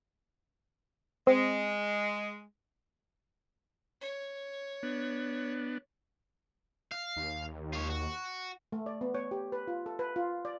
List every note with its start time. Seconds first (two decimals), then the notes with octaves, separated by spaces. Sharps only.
1.27 G#3 C4
4.01 C#5
4.83 B3 D4
6.92 F5
7.16 D#2
7.73 F4 C#5
7.90 F#4
8.72 A3
8.86 D5
9.01 B3
9.14 C#5
9.31 G4
9.52 B4
9.68 F4
9.86 A4
9.99 B4
10.16 F4
10.45 D5